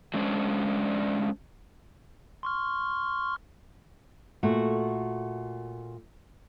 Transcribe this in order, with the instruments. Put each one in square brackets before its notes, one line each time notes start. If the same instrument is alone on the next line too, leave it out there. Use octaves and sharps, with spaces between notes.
[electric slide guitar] F#3 G#3 C#4 D4 C5 D5
[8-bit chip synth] C6 C#6 F6
[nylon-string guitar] A#2 A3 F#4